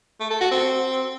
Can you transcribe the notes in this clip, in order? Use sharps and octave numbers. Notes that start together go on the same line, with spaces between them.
A3
A4
F#4
C4